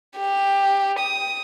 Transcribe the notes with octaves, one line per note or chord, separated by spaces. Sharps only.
G4
D#6